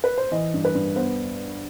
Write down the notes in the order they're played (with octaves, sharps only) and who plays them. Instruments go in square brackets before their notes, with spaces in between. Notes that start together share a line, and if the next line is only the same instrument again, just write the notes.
[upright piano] B4
C5
E3 D#5
G2
B4
G2
B3 C5